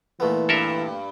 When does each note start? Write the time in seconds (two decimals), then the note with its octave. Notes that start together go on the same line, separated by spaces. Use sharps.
0.20 A#2 E3 A3 B3
0.49 G2 A4 A#4 E5